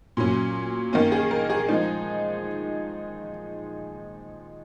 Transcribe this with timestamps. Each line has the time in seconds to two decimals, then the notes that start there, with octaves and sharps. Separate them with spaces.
0.17 A#2 F#3 C#4
0.93 D#3 A#3 C#4
1.12 G#4
1.31 A#4
1.50 G#4
1.69 F3 G#3 D#4